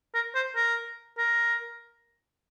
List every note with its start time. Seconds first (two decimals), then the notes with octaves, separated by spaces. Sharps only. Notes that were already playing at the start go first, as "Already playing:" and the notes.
0.14 A#4
0.35 C5
0.56 A#4
1.18 A#4